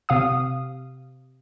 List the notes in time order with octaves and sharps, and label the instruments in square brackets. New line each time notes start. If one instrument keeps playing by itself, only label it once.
[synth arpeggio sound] C3 F5 D#6